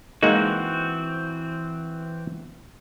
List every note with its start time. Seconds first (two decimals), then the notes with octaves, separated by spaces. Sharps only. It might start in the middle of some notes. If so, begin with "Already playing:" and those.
0.23 E3 G#3 A#3 C4 D#4 F#4